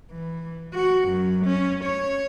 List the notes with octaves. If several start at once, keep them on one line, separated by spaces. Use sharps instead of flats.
E3
F#4
F#2
C#4
C#5